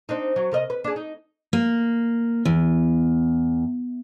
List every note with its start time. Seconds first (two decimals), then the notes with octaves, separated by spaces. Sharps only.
0.09 C4 D4 D#4
0.36 F#3
0.52 C3 A#4 D#5
0.70 B4
0.84 D4 G#4
0.96 D#4
1.53 A#3
2.45 E2